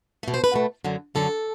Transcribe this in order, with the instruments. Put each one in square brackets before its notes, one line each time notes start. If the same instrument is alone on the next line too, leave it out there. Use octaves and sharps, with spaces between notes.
[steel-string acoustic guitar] B2 A3
C5
B4
B2 A3
F#2 D3 F#3
F#2 D3 F#3 A4